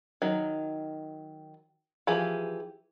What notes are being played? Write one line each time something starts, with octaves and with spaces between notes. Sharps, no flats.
D#3 F#3
E3 F3 G4 G#4